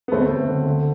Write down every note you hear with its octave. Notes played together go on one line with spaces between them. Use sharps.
B3
D2 A3 C4
D2
D3
D3